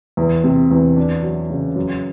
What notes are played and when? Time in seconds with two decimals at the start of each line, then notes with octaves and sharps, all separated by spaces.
0.17 E2
0.44 C3
0.71 E2
0.96 D4
1.23 F#3
1.50 C#3
1.75 F#2